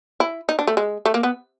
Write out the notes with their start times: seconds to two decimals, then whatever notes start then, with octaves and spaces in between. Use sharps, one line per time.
0.20 E4
0.49 D#4
0.59 D4
0.67 A3
0.77 G#3
1.06 A3
1.14 A#3
1.23 B3